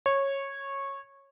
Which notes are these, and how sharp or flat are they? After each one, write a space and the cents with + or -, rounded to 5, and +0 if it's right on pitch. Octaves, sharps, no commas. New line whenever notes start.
C#5 -15